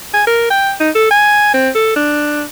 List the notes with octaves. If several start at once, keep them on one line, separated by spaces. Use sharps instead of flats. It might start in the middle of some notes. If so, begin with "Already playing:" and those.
G#5
A#4
G5
D#4
A4
G#5
C4
A4
D4